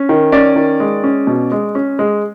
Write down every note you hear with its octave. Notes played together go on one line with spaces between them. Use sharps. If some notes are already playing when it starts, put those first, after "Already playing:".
Already playing: C#4
D#3
C#4 D5
D#3
G#3
C#4
B2
G#3
C#4
G#3